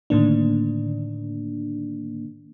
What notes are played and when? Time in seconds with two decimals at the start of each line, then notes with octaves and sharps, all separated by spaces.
0.10 A2 D3 D#3 A#3 D4